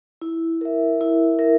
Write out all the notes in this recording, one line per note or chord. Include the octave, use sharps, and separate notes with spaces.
E4
A#4 E5
E4
A#4 E5